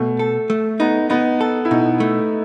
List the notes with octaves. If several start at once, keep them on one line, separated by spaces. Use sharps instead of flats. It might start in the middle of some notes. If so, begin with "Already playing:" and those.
Already playing: B2 A3
A4
A3
B3 D#4
B3 D#4
A4
E4
B2 D#4
A3